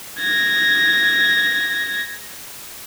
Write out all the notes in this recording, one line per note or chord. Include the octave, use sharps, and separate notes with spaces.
G#6 A#6